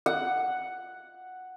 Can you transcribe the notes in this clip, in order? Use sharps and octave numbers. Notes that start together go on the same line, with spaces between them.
F#5